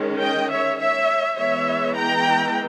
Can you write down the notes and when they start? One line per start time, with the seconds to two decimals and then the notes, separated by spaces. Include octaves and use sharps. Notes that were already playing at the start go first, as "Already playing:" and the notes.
Already playing: D#3 G#3 C#4
0.21 D#5 G5
0.51 C#5 E5
0.80 C#5 E5
1.38 E3 G#3 B3 C#5 E5
1.96 G5 A#5